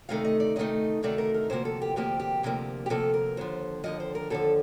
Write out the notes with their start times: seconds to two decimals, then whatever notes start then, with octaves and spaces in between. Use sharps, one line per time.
0.09 D2 C3 D#3 A3 D#4 F5
0.25 D#5
0.40 D5
0.56 D2 C3 D#3 A3 D#4 D#5
1.03 D2 C3 D#3 A3 D#4 D5
1.18 A#4
1.34 A#4
1.50 D2 C3 F3 A#3 C5
1.65 A4
1.82 G4
1.96 D2 C3 F3 A#3 G4
2.20 G4
2.43 D2 C3 F3 A#3
2.86 G4
2.90 D2 C3 F3 A#3 A4
3.14 A#4
3.37 D#2 D3 F3 C5
3.84 D#2 D3 F3 D#5
4.00 C5
4.15 A#4
4.30 D#2 D3 F3 A4